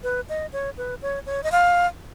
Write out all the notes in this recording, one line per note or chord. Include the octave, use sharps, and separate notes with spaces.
B4
D#5
C#5
B4
C#5
C#5
D#5
F5